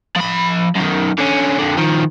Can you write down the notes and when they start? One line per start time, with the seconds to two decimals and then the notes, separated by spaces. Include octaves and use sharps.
0.16 F3 B5
0.75 F#2 D#3
1.18 D3 C#4
1.59 F2 D3
1.77 D#3 F3